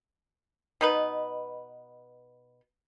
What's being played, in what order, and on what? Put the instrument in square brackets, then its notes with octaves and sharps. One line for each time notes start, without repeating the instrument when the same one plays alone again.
[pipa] B2 D#4 B4